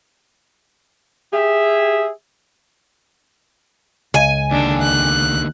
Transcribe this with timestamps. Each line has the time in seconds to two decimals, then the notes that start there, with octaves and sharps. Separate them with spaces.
1.33 G4 G#4 E5
4.14 C#2 D#5 G#5
4.51 D#2 D3 D4
4.82 F#6